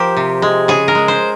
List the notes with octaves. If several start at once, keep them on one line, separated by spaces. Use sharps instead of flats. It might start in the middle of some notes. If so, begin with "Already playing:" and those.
Already playing: F3 G4 A#4 C5
C3
G#3
C#3 G#4
A#4
G#3
C5